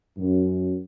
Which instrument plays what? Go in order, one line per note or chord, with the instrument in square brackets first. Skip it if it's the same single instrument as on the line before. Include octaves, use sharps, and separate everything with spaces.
[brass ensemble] F#2